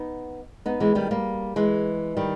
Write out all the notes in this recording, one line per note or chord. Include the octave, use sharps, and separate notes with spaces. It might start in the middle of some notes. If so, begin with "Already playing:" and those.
Already playing: B3 D#4
B3 D#4
E3 G#3
D#3 G3
G3 A#3
E3 G#3
D#3 G3